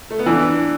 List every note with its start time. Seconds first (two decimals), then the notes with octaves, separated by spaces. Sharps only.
0.11 A3
0.19 B3
0.26 E3 D4